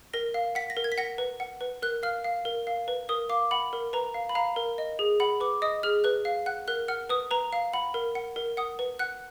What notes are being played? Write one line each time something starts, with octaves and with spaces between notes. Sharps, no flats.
A#4 A#6
F5
F#5 B6
A#6
A#4
G#6
B6
F#5 A#6
B4
F#5
B4
A#4 F#6
F5 F6
F5
A#4
F5
B4
A#4 D#6
F5 D6
F#5 B5
A#4
B4 A#5
F5
B5
F5 A#5
A#4
D#5
G#4
F#5 B5
B4 D6
D#5 D#6
G#4 F6
B4 F#6
F5
F#5 F#6
A#4 F#6
F#5 F6
B4 D#6
B4 A#5
F5
F#5 B5
A#4
F#5
A#4
F#5 D#6
B4
F#5 F#6